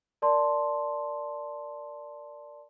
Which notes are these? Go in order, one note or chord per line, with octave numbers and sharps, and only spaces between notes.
A#4 D5 A5 C6